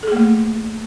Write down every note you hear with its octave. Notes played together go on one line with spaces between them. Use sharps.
A3 A#3 G#4 A4